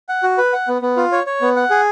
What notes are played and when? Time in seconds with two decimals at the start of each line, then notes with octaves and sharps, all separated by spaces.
0.09 F#5
0.23 F#4
0.38 B4
0.53 F#5
0.68 B3
0.82 B3
0.97 F4
1.12 C#5
1.27 C#5
1.41 B3
1.56 F#5
1.70 G#4